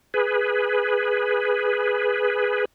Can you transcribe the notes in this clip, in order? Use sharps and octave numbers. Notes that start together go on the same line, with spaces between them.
G#4 B4